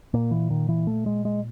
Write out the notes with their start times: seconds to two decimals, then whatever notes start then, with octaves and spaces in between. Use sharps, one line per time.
0.14 A#2 A#3
0.31 E3
0.50 D#3
0.69 E3
0.87 A3
1.06 G#3
1.25 G#3